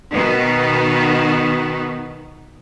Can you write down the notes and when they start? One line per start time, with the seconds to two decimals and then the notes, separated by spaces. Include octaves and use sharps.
0.12 B2 D#3 B3